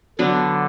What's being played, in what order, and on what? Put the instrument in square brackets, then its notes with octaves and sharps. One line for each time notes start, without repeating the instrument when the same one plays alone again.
[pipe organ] D3 [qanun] F#3 B3 D4